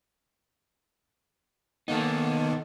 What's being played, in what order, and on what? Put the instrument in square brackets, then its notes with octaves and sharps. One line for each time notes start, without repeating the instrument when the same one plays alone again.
[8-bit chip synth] D#3 A#3 B3 [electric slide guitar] D#4 A4